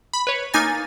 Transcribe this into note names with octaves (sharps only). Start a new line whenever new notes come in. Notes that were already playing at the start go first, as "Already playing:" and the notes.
B5
B4 C#5
A#3 D#4 G#5 A6